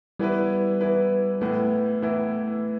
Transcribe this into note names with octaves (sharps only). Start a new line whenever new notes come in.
E3 G3 B3 E4 B4
E3 B3 E4 B4
A2 E3 A3 B3 E4
A2 E3 B3 E4